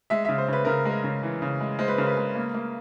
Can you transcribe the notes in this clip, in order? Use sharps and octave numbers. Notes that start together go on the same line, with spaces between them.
G#3 E5
C#3 E5
C5
C#3 B4
C#3 A#4
G#3 A#4
C#3
E3
C#3
G#3
G#3 C5
B4
C#3 A#4
B4
G#3
A#3
A#3